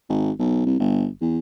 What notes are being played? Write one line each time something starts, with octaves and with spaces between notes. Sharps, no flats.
G#1
B1
C2
G1
E2